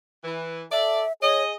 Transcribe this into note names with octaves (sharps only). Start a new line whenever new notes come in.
E3
A4 D5 E5
G#4 C#5 D#5